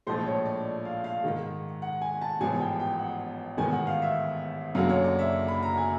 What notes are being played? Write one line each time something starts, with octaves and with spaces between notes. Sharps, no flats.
A#1 A2 F3 G#3 C5
C#5
D5
F5
F5
G#2 D#3 G#3
F#5
G#5
A5
A1 G#2 F3 G#3 B3 G#5
G5
G5
F#5
A1 G#2 D#3 G#3 B3 G#5
F#5
F5
E5
F#1 F#2 D3 F#3 F5
C#5
D5
E5
B5
A#5
G#5